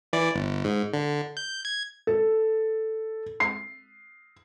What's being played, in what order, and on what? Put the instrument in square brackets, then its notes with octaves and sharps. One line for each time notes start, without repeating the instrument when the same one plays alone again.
[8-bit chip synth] E3 D5
G1
G#2
D3
G6
G#6
[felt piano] A4
C7